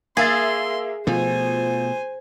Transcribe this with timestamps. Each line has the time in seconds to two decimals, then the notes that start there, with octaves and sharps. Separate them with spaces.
0.17 A#3 G#4 E5 C6 A6
1.07 B2 F3 A3 C5 G#5